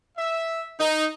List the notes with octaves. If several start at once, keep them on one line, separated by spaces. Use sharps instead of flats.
E5
D#4